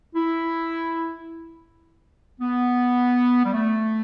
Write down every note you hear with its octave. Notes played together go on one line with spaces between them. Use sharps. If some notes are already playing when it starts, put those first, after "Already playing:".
E4
B3
G3
A3